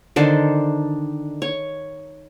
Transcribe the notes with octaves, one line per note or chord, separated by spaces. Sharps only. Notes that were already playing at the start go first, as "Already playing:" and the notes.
D3 D#3 D4 C5
C#5